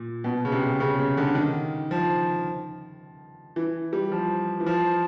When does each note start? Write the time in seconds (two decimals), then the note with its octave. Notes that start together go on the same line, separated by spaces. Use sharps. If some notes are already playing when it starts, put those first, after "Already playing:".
Already playing: A#2
0.24 B2
0.45 C#3
0.52 C3
0.80 C#3
0.99 C#3
1.17 D3
1.35 D#3
1.91 F3
3.56 E3
3.93 G3
4.12 F3
4.60 E3
4.66 F3